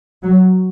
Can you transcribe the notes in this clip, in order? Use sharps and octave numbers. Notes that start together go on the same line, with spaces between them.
F#3